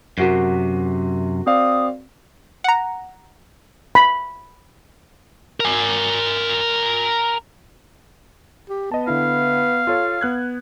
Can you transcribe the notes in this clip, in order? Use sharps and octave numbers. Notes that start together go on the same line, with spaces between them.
F#2 C3 F#4 A#4
C4 D5 F5 D#6
F#5 A#5
B5
A#4 G#5
G4
B3 D#5 A5
D3 E4 F5
F4 A4 C#5
B3 F#6 G#6